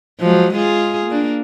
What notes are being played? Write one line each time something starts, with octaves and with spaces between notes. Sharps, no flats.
F3 F#3 G#3
G#3 F4 G#4
A#3 D4